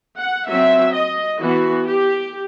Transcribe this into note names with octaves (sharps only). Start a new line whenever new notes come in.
F#5
F#3 C4 E5
D#5
E3 B3 F#4
G4